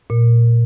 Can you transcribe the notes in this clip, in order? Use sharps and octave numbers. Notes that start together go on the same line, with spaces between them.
A#2